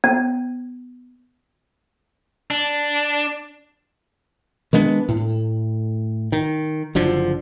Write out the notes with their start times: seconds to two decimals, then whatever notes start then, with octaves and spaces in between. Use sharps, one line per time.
0.04 B3
2.51 D4
4.73 D#3 G#3 B3 D4
5.09 A2
6.32 D#3
6.95 F#1 D3 F3